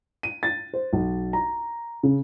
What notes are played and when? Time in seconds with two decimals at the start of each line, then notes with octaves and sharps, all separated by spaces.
0.23 D#7
0.43 A6
0.74 C5
0.93 B1
1.33 A#5
2.03 C#3